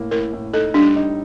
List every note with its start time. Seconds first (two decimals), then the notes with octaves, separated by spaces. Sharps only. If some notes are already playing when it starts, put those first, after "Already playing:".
Already playing: A2 A#3
0.11 A2 A#4
0.33 A2
0.53 D#4 A4
0.74 G3 D4
0.96 D#4